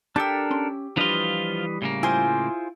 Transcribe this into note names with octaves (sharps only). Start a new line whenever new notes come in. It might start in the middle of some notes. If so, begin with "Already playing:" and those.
D4 G4 A4 A#4 A5 E6
C#4 C6
E3 F3 G3 D4 F4 B4 D#5
A2 C#3 A#3
E4 F4 G#4 C5